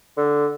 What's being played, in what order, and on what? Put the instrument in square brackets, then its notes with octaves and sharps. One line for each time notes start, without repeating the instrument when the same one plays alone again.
[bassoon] D3